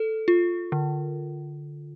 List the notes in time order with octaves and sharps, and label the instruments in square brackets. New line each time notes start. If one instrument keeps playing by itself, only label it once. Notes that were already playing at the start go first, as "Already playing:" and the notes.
Already playing: [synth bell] A4
F4
D3